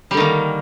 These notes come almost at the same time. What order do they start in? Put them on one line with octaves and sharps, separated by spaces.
G3 D3 D#3 A#3